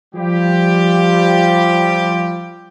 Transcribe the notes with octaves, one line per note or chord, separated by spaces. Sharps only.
F3 G3 F4 G4